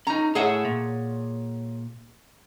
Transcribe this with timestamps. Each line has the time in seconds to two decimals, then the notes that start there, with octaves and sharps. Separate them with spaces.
0.07 C#4 D#4 A#5
0.35 A2 G#4 C#5 D#5 E5 F#5
0.65 A#2